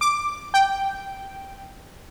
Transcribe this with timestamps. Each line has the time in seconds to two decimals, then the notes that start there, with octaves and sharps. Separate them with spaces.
0.01 D6
0.54 G5